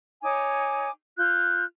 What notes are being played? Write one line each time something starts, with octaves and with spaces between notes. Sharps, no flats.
D#4 C#5 G#5 D6
F4 F#6 G6